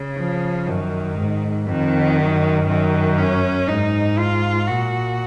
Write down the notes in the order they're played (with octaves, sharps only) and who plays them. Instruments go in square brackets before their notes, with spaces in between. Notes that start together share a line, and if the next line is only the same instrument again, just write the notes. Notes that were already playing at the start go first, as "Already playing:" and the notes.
Already playing: [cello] C#3
[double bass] F3
[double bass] F#2 [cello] D#3
[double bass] G#2
[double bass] F2 [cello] D#3
[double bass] F#2
[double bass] F#2 [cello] D#3
[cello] C#4
[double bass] G#2 [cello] D#4
[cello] F4
[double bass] A#2 [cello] F#4